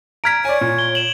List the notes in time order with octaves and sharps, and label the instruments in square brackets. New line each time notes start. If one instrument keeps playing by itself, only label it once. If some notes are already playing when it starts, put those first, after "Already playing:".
[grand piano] A#5 F6 B6 [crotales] G#6 D7
[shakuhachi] C#5 [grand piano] D5 G#5
[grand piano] A#2
[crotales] G7
E7 F#7